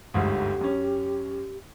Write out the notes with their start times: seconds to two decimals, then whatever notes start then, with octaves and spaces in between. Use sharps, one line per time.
0.14 G1 D2 G#2 G4
0.61 F#2 C#4